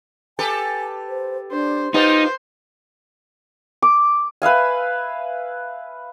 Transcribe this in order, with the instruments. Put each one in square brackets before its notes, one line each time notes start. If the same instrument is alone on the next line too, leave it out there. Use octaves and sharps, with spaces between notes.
[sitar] G4 A4 B4 [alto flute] G#5
[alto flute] C5
[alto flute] D4 [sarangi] C5
[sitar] B3 F4 G4 [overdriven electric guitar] D#4 [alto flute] B4 [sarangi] C5
[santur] D6
B4 E5 F5 G#5